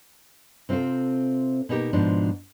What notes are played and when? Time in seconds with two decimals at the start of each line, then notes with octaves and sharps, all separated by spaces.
0.69 C3 C4 F4 A4 C5
1.69 B2 A#3 D#4 E4 G4 A#4
1.93 G#2 B2 F3 D4